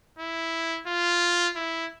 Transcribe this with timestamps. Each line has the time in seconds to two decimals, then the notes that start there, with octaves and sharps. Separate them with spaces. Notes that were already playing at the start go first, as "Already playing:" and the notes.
0.19 E4
0.87 F4
1.56 E4